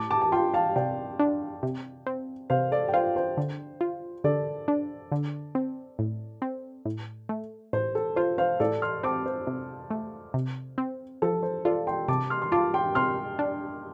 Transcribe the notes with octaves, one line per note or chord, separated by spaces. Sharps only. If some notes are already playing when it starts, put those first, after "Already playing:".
Already playing: A2 A5 D6
A5 D6
A5
F4 G5 C6
F5 A5
C3 D5 G5
D4
C3
C4
C3 C5 F5
A4 D5
G5
F4 C5 F5
C5
D3
F4
D3 A4 D5
D4
D3
C4
A2
C4
A2
A3
A2 C5
A4
F4 C5
C5 F5
A2 A4 D5
C6 F6
C4 A5 D6
C5
C3
A3
C3
C4
F3 A4
C5
F4 A4 D5
G5 C6
C3 A5 D6
C6 F6
C6
F4 A5 D6
G5 C6
C3 C6 F6
D4